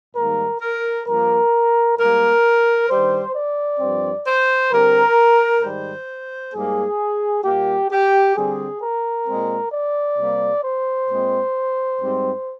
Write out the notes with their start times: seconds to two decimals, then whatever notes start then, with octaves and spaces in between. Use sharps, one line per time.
0.16 G#2 D#3 G3 A#3 A#4
0.61 A#4
1.07 G2 F3 A#3 A#4
1.98 G#2 G3 A#3 A#4
2.89 G2 D#3 G3 C5
3.35 D5
3.79 G2 F3 C4
4.25 C5
4.71 D3 G3 C4 A#4
5.62 G#2 D#3 G3 C5
6.54 G#2 G3 A#3 G#4
7.44 A#2 G3 A#3 G4
7.90 G4
8.36 D3 G3 C4 G#4
8.81 A#4
9.27 A#2 G#3 C4
9.72 D5
10.18 C3 G3 A#3
10.64 C5
11.09 A#2 G#3 C4
12.00 G#2 G3 C4